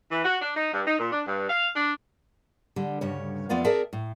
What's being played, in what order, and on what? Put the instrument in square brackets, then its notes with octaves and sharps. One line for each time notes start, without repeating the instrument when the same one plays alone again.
[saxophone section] E3
F#4
D4
D#4
G2
D#4
A#2
D4
G2
F5
D4
[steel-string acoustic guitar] D3 G3
D2 G2 C#3 C#5
F2 A3 B3 F4 D5 F5
C4 G#4 A#4 D5 E5 A5
A2